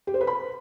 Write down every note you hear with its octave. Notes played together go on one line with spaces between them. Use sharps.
G4
C5
B4
B5